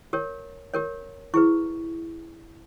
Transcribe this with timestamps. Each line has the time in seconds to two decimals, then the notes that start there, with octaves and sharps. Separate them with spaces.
0.13 G4 A#4 C#5
0.74 G4 A#4 C#5
1.34 E4 G#4 B4 C#6